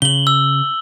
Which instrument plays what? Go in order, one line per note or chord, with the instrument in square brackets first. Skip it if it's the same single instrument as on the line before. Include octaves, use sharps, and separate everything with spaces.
[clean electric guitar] C#3 [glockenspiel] F#7 G7
[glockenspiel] E6